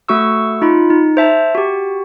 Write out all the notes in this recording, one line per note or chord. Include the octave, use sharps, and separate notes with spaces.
A3 F#4 C#6 E6
D#4 F4 B5
D#4
C5 E5 A5
F#4 G4